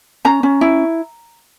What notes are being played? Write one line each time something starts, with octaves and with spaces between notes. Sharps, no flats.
C#4 A#5
C#4
E4